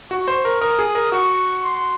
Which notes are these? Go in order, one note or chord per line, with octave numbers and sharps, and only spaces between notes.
F#4 C#6
C5
A#4
A#4 D#6
G#4
A#4
F#4 C#6
C6